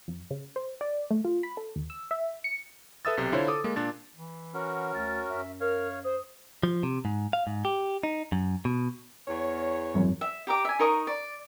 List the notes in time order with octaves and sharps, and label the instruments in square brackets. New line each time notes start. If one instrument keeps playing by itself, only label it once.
[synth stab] F2
C#3
C5
D5
A3
F4
B5
A4
D#2
E6
E5
C#7
[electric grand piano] A4 B4 E5 D#6 E6 A6
B1 C3 A6
D3 E4 F4 C5 C#5
A4 D6 D#6
G#3 A#3
A#2 D4 A6
[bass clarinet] E3
[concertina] C#4 F#4 A#4 [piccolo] F#5
[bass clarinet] D2 [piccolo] A6
[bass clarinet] F#2 [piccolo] E5
[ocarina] A#4 [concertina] C#5 F5 [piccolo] F6
[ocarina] C5 [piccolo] D#6
[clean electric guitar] F3
C3
G#2
F5
G#2
G4
D#4
F#2
B2
[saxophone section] E2 C#5
[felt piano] G#1 F#2 E3
[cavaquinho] E5
G4 A#5 D6
E5 G#5
D#4 A#4 C#6 D#6
D5